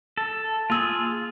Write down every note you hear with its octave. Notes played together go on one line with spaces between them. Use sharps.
A4
A#3 F4 G#4 E6